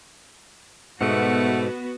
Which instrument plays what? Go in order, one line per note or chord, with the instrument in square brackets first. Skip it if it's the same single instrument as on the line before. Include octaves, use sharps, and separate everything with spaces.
[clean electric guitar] G#2 B2 [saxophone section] A3 E5 F#5 [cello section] B3 F#4